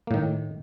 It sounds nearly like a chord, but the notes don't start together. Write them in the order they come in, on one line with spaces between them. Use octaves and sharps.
A#3 A2 D#3